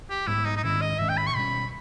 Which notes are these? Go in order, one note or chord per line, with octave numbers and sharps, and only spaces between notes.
G4
G#2 G3 B3 E4
D#4
D#4
G#2 D#3 G#3 C#4 E4
D#5
G#2 D#3 G#3 C#4 E5
G5
B5
C#6
B2 G3 C#4 B5